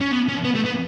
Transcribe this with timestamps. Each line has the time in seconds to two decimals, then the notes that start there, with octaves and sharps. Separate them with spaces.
0.01 C#4
0.12 B3
0.28 C#4
0.44 B3
0.55 A3
0.65 B3